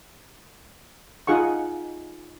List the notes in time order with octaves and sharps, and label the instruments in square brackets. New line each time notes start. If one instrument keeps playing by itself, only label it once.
[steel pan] D#4 F4 G#4 F#5 C#6